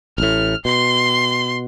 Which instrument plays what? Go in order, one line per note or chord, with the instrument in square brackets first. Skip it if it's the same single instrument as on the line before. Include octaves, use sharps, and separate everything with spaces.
[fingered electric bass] A1 A2 [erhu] F6
[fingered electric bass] B2 [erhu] C6